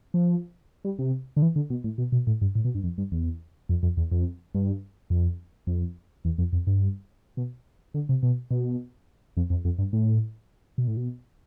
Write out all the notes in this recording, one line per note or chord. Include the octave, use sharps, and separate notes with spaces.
F3
G3
C3
D3
E3
D3
B2
A2
B2
B2
A2
G2
A2
B2
G2
F2
G2
E2
F2
F2
E2
F2
G2
F2
F2
E2
F2
F2
G2
B2
D3
C3
B2
B2
F2
F2
F2
G2
A2
B2
A2
B2